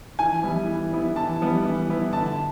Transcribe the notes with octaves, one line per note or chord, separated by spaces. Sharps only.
E3 G#5
G3 B3 E4
E3
G3 B3 E4
E3 A5
G3 B3 E4
E3
G3 B3 E4
D3 A5